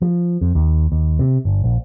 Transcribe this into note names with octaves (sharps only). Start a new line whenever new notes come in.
F3
F2
D#2
D#2
C3
G1
A#1